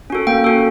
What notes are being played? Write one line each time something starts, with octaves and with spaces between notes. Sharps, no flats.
C#4 F#4 A4
A#3 G5
C#4 F#4 A4